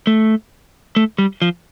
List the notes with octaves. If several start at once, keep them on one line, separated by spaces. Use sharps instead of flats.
A3
A3
G3
F3